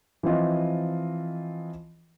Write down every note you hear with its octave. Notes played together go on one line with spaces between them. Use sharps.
E3 F3 C4 F4 D#5